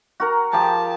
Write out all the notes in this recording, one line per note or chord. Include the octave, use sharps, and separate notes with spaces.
F#4 A#4 A#5
F3 G4 G#4 A5